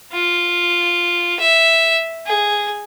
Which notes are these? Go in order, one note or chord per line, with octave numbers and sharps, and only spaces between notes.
F4
E5
G#4